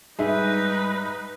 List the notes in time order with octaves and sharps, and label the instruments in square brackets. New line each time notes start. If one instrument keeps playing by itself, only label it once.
[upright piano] G#2 E5 [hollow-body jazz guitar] G3 G#4 [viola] D#4 B4